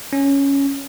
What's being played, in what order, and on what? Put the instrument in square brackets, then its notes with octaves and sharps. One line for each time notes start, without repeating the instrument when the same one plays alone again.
[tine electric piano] C#4